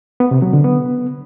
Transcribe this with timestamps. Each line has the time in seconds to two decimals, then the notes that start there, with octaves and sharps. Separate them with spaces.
0.20 B3
0.31 C3
0.42 F#3
0.53 D3
0.64 B3